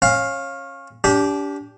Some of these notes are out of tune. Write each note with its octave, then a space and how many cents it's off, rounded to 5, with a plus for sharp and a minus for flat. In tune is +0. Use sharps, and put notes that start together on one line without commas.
C#4 -25 F5 +5
D4 -35 G4 +0